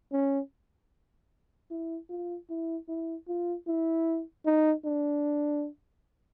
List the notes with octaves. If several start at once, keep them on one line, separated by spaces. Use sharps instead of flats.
C#4
E4
F4
E4
E4
F4
E4
D#4
D4